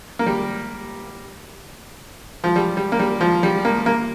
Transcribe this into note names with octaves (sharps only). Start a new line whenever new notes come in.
A#3
G3
F3
G3
G3
A#3
G3
F3
G3
A#3
A#3